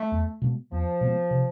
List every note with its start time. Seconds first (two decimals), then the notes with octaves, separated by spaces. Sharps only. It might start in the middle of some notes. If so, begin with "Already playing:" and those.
Already playing: A3
0.12 E2
0.42 B2 G#3 B3
0.71 E2 F3
1.01 B2 G#3 B3
1.31 C3